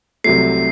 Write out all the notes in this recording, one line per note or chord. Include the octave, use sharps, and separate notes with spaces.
C2 C3 F#3 A3 C7